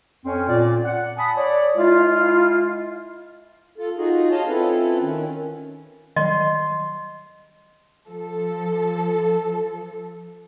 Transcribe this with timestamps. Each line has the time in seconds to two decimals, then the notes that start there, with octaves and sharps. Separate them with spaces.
0.24 F2 C4 C#4
0.47 A#2 D5
0.84 F#5
1.17 G#5 A5 B5 D#6
1.36 C#5 D5
1.76 G#3 E4 F4
3.78 F4 A4
3.97 D#4 F4 F#4 G#4
4.31 C#5 D#5 F5 A5
4.48 C4 C#4 E4 F4 A4 B4
5.01 D#3 C#4
6.16 D#3 F#3 G3 D#5 C6
8.08 F3 A4